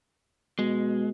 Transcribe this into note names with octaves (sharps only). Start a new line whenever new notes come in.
B2 G#3